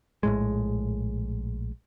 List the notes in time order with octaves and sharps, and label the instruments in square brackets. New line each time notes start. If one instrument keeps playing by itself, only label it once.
[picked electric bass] A#1 A2 G#3